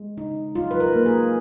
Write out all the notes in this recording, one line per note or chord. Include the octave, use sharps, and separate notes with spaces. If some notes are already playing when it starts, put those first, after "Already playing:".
Already playing: G#3
C#3 D#4
F#3 F4
B4
A#4
A#3
G#4